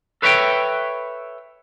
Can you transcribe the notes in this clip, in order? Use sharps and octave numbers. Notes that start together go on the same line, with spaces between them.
A4 B4 C#5 E5 F5 G5